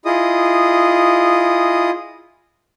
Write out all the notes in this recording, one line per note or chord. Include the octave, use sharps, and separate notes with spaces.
E4 F4 G#4 D#5 D#6